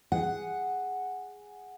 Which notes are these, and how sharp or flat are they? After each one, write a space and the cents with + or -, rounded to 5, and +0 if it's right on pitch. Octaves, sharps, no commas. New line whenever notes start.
G#4 +0 F#5 +0